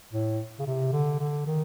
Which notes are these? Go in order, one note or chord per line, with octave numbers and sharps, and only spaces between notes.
A2
C#3
C3
D3
D3
D#3